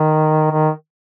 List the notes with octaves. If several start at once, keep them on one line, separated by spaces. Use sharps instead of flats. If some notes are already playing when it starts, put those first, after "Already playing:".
Already playing: D#3
D#3